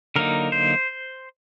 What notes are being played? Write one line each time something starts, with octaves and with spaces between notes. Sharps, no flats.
D3 F#3 A#3 D#4 A#4
C5